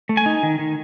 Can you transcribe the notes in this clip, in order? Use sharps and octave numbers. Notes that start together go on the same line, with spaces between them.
A3
G#5
D#4
D#3
D#3